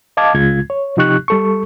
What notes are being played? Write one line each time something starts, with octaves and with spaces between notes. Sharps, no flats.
D#5 F5 A5 D6 G#6
C#2 C#3 G#3 F4 G#6
C#5
C3 F3 D#4 G4 C#6 F#6
G3 A4 C#6